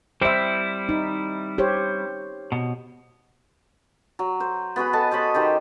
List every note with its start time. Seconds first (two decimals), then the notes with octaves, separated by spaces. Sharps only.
0.21 G3 C4 E4 C5 E5
0.89 D#4
1.58 G4 C5 C#5
2.52 B2
4.19 F#3
4.40 C5
4.76 B3 F#4 G#4 B5
4.93 A4 D#5 A5
5.11 C5 C#5 D#5 B5
5.35 D#3 G4 C5